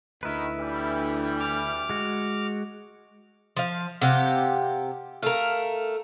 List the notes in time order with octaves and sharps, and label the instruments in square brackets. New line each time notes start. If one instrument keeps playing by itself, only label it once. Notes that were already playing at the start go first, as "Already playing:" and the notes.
[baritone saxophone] D2 [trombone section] D#3 [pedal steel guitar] E4 B4
[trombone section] E3 G3
[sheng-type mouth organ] D6 F6
[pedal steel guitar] G#3 F#4
[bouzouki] F3 F5
[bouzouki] C3 G4 [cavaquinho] F5 F#5
[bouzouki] A3 A#4 [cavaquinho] F5